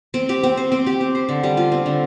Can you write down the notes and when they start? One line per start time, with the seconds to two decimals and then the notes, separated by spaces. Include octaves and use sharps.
0.14 C4
0.29 G4
0.43 C4
0.57 C5
0.72 C4
0.86 G4
1.01 C4
1.15 C5
1.29 D3
1.43 G3
1.57 F4
1.72 C4
1.86 D3